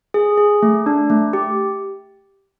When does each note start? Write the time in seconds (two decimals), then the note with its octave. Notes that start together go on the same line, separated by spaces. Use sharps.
0.14 G#4
0.38 G#4
0.62 A3
0.86 D4
1.10 A3
1.33 G4